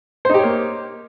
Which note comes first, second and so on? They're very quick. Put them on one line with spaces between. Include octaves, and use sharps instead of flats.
C5 D#4 G4 C#5 A#3